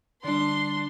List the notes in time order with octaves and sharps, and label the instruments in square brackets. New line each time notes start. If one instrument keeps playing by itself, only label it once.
[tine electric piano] D3 G3 [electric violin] D4 [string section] C6